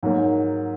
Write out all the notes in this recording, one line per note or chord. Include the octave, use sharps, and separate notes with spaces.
G#2 F#3 A#3